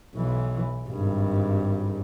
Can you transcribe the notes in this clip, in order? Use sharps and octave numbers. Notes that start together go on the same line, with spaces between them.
B1 E3
G#1 G2